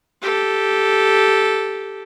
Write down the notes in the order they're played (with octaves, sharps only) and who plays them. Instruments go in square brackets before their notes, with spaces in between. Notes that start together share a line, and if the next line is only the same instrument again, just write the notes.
[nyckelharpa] G4 A4